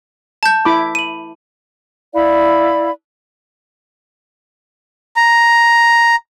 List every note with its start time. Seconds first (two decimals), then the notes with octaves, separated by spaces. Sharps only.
0.43 A5 G6
0.65 E4 B5 D6
0.95 D#7 F#7
2.13 E4 D5 F5 B5
5.16 A#5